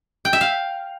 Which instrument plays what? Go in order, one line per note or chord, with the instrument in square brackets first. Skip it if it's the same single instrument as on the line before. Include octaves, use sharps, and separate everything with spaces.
[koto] G5
E5
F5